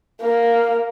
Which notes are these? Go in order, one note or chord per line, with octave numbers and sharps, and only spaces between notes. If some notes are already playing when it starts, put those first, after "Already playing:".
A#3